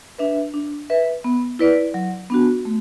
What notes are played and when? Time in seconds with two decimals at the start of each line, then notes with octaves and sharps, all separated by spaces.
0.18 D4 B4 E5
0.54 D4
0.90 B4 E5
1.24 B3
1.59 E4 B4 D5
1.94 F#3
2.30 B3 D4 F#4
2.65 A3